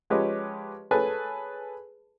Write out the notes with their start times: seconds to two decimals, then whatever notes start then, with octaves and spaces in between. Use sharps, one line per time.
0.10 F3 G#3 C#4 G4 B4 D#5
0.91 G#4 A4 B4 C#5 G#5 A5